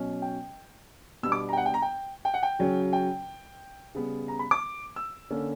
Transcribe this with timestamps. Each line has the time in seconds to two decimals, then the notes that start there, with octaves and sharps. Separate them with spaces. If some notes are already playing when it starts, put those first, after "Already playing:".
Already playing: B2 F#3 C#4
0.22 G5
1.23 B2 G3 B3 D4 E6
1.32 D6
1.49 A#5
1.53 G5
1.57 F#5
1.66 G5
1.74 A#5
1.82 G5
2.25 G5
2.34 F#5
2.43 G5
2.59 C#3 F#3 C#4
2.93 G5
3.95 C#3 G3 B3
4.28 A#5
4.39 B5
4.51 D6
4.96 E6
5.30 D3 A#3 C#4